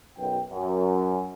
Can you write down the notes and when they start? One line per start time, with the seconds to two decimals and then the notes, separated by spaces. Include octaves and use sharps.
0.18 B1 F#2 B3 G5
0.50 F#2